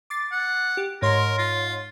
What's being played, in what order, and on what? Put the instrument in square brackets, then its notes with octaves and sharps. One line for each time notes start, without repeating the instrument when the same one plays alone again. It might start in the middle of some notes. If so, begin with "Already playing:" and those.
[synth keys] D6 A6 C7
[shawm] F#5
[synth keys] G4
[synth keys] G#2 C#5 C6 [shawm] A#4
[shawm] F4